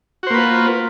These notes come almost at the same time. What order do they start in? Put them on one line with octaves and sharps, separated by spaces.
F#4 C5 A#3 B4 F4